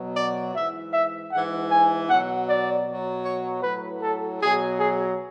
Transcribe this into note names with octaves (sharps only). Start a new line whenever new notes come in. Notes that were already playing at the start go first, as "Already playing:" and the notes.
Already playing: B2 F#3
D5
G#2 E3 E5
E5
G#2 E3 F#5
G#5
B2 F#3 F#5
D5
B2 F#3
C#5
A2 F#3 B4
A4
B2 F#3 G#4
G#4